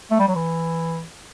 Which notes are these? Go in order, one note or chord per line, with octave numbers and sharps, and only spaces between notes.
A3
G3
F#3
E3